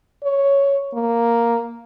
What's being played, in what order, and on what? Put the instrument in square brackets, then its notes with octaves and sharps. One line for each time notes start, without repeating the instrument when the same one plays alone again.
[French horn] C#5
A#3